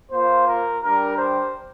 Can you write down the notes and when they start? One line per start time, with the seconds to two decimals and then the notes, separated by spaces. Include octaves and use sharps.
0.11 A#3 F4 C5
0.47 A#4
0.83 G3 D4 G4 A#4
1.18 C5